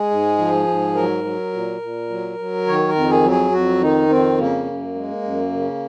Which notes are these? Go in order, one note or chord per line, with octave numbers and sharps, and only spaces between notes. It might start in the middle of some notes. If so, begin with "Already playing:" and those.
Already playing: G#3 G#4
G#2
F3
G#2
F#3 A#4
F#3
A#2
A#2
F#3
F#3
D#3 C#5
A#4
F2
G#4
F#3
G#4
F2 F#4
D#3 D#4
F2 C4
C#3 A#3
F#2
G#3
F#2
C#3